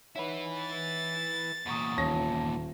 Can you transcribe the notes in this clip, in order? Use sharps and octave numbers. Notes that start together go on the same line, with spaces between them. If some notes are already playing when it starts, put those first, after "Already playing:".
D#4 E4 B4 C#5 F#5
A6
E2 A#2 F#5 C#6 D#6
D#1 C#4 A5 A#6